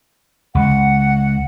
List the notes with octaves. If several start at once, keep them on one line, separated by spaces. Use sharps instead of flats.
C#2 F#5